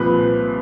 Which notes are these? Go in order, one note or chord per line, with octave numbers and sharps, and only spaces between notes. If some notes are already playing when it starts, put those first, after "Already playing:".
Already playing: C2 A#2 F3 B4